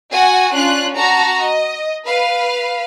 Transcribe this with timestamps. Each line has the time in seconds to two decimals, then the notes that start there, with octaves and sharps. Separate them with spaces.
0.12 F#4 F#5 G#5
0.52 C#4 D4 F4 F#6
0.95 F#4 A5 A#5
1.39 D#5
2.06 B4 F5